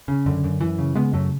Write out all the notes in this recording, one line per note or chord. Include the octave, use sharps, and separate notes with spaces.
C#3
F#2 D3
F#2
F#2 E3
C#3
C#3 G#3 B3
F#2 F#3 A3